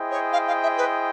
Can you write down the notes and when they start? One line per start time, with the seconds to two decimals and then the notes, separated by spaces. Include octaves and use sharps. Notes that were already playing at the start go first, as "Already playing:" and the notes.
Already playing: E4 G#4 C5 D#5 G5
0.11 C#5
0.33 F5
0.47 F5
0.62 E5
0.77 B4